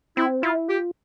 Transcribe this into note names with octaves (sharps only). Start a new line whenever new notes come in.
C4 E4
E4 F4
F4 G4